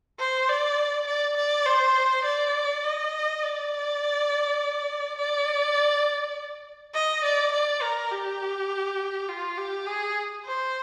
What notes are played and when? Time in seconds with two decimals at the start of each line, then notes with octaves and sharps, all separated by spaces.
0.20 C5
0.49 D5
1.07 D5
1.37 D5
1.66 C5
2.25 D5
2.84 D#5
3.43 D5
5.18 D5
6.95 D#5
7.24 D5
7.53 D5
7.82 A#4
8.12 G4
9.29 F4
9.57 G4
9.87 G#4
10.45 C5